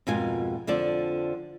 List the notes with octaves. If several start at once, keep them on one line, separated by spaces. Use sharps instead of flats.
F2 G#2 B2 A#3 F4 G#5
F2 D3 F3 D5